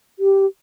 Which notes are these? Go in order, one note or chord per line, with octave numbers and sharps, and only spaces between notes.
G4